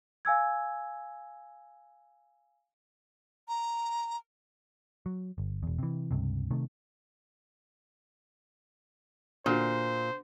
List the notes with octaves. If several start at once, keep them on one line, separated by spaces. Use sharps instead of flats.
F5 G#5 E6 G#6
A#5
F#3
G1
E1 E2
C3 E3
C#2 G2 C3
C3 D#3 A3
A#2 D3 F#4 C5